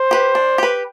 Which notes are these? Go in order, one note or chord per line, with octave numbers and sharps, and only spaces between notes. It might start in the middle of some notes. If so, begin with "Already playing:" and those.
Already playing: C5
G4 B4
D4
G4 B4